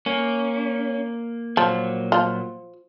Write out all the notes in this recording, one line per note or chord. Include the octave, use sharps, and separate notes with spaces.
A#3 C#4
A#2 F3 F#3
F3 F4